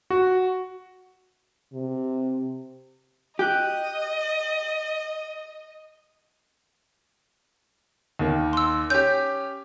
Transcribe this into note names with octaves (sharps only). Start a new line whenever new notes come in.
F#4
C3
G4 D#5 F#6 G6
D#2 D#3
C6 E6
C#4 G4 G6